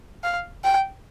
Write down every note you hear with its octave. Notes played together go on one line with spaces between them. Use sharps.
F5
G5